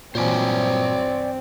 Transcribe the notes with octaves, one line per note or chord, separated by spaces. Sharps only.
G2 A#2 E3 F#3 C4 C5 D5 G#5